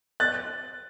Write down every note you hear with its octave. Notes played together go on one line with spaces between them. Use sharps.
F#6 A6